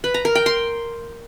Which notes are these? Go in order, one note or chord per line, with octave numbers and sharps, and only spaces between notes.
B4
A#5
A#4
G5
C6